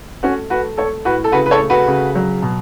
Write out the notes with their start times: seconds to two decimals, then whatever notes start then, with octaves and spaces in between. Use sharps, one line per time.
0.23 A3 C#4 F#4
0.50 A3 F#4 B4
0.77 A3 A4 C#5
1.05 A2 F#4 B4
1.24 A4
1.32 C#3 F#4 B4
1.46 B4
1.51 A4 C#5
1.60 A3
1.70 F#4 B4
1.88 C#3
2.15 F#3
2.42 B2